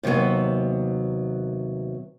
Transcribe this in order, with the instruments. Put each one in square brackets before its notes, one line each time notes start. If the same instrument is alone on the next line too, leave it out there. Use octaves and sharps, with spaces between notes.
[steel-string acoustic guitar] D#2 C3 D#3 F#3 B3